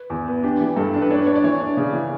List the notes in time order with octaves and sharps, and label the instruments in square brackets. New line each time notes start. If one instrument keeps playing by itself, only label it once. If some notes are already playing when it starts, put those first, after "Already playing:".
Already playing: [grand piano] B4
[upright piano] E2
B3
[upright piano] D4 [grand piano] G4
[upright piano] E3
[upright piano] G2 [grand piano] A4
[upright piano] D4 [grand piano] A5
[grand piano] B4
[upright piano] D4 [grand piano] C#5
[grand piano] B4
[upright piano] D4 [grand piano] C#5
[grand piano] D5
[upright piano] E3 [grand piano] C#5
[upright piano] D4
C#3
E3